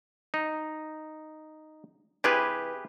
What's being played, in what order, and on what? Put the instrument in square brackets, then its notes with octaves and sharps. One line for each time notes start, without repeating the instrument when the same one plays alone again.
[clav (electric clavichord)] D#4
[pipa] C3 E3 [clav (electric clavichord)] G4 G#4 B4